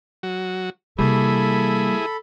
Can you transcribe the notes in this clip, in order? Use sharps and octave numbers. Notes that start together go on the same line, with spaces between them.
F#3 F#4
C3 E3 G3 A#3 E4 G#4 A4 B5